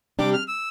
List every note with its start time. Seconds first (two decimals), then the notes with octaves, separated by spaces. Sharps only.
0.19 C3 G3 D4 G4 D6
0.33 F6
0.48 E6